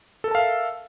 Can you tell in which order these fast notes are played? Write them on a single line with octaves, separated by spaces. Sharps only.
A4 A#4 A5 F5 E5